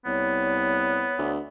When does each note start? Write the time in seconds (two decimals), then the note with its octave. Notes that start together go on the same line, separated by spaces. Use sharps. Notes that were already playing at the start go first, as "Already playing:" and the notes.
0.05 C2 B3 C#5
1.18 D2